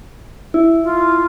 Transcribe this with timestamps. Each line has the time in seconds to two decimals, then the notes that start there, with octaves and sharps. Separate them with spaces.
0.54 E4
0.84 F4